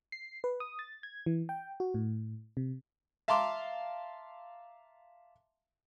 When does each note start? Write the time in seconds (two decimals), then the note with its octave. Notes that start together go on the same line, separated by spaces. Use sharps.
0.12 C7
0.44 B4
0.60 D#6
0.79 A6
1.03 G#6
1.26 E3
1.49 G5
1.80 F#4
1.94 A2
2.57 C3
3.28 E5 F5 A5 A#5 C6 D6